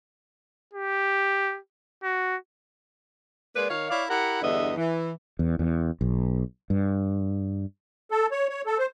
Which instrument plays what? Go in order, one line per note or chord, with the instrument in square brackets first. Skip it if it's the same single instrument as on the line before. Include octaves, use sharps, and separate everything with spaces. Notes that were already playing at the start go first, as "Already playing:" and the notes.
[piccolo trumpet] G4
F#4
[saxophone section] G#3 A#3 B4 D5
D#3 C#5 F5
E4 C#5 D5 F5
E4 G4 A#4 F#5
E2 G2 D3 B3 D#5 E5
E3
[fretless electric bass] E2
E2
B1
G2
[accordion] A4
C#5
C#5
A4
C5